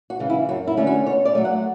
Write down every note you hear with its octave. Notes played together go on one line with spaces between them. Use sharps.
F#4
C#3 E3 G#3
E4
F#2 F#4
E4
D3 A3 C#4
F#4
B2 C#5
D5
F#3 A3
F#5